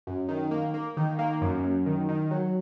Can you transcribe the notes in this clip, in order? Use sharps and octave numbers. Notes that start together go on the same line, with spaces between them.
F#2
D#3
A#3
A#3
D#3
A#3
F#2
F#2
D#3
D#3
F#3